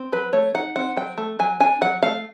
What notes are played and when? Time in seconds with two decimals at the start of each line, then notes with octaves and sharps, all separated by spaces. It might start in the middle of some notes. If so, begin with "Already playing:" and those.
Already playing: C4
0.12 F#3 B4
0.33 A3 C#5
0.55 D#4 F#5
0.76 C4 F#5
0.96 F#3 G5
1.18 A3
1.39 F#3 G#5
1.60 D4 G#5
1.81 F#3 F#5
2.03 A3 F5